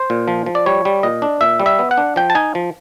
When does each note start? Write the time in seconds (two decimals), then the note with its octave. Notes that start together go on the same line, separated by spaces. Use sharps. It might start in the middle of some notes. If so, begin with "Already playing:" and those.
Already playing: C5
0.10 A#2
0.28 F3
0.46 F3
0.55 D5
0.66 G3 C#5
0.85 G3
1.03 A#2 D#5
1.22 D4
1.41 A#2 E5
1.60 G3
1.66 E5
1.79 B3
1.91 F#5
1.98 D4
2.16 F3 G5
2.30 A5
2.35 D#4 G#5
2.55 F3